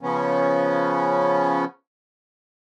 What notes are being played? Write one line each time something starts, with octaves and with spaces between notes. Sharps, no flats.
C#3 F3 B3 C#4